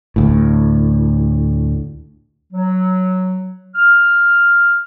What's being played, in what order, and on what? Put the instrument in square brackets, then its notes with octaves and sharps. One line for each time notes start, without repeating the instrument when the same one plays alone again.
[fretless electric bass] D2 A2
[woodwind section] F#3
F6